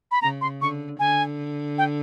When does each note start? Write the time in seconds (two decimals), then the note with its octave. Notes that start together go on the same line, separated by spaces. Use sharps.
0.11 B5
0.22 C#3 A#5
0.41 C6
0.61 D3 C#6
0.99 D3 G#5
1.78 G5